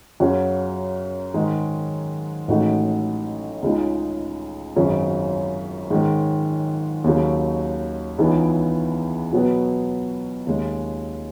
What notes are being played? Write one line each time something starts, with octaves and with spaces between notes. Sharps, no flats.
F#2 C#3 F#3 C#4 F#4
G#2 D#3 G#3 D#4
A1 A2 G#3 D#4 F#4
C#2 C#3 G#3 D#4
G#1 F#2 C#3 F#3
G#2 D#3 G#3 C#4
D#2 C#3 F#3
C#2 C#3 E3 B3 D#4
B2 F#3 B3 F#4
D#2 C#3 G#3